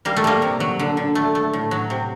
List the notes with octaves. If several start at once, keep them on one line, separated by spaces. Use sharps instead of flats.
G3 A#3
A3
G3 A#3
C3
F#3
D3
D3
A3
A3
A2
F#3
C3